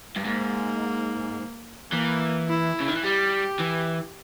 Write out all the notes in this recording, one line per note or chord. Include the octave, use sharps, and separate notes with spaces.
G2
G#2 A#3
E3 A#3
E4
C#3
D#3
E3
G3 G4
E3